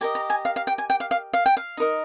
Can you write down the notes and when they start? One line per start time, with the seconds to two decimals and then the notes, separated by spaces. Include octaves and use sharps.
0.01 G4 A#4 D#5 G#5
0.15 A#5
0.30 G#5
0.45 F5
0.56 F5
0.67 G5
0.78 G#5
0.90 G5
1.00 F5
1.11 F5
1.34 F5
1.46 G5
1.57 F5
1.77 D#4 A#4 D#5